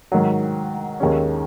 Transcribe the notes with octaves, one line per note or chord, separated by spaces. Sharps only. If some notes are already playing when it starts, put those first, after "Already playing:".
G#2 D#3 F#3
D#2 D#3 G#3 C#4